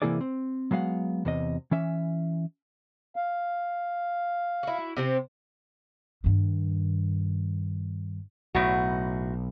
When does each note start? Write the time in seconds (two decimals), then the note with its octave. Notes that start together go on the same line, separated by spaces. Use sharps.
0.02 C3 E3 A#3 E4 G#4 D5
0.21 C4
0.71 F#3 G#3 B3 F5 F#5
1.25 E2 C3 D#5
1.71 E3 C#4 E5
3.16 F5
4.63 E4 F#4
4.97 C3 C4 G4
6.24 G2 D#3
8.55 B1 A2 F#4